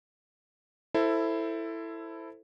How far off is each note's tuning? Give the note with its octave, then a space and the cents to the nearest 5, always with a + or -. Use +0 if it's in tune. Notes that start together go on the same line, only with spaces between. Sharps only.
E4 +5 A4 +15 C5 +0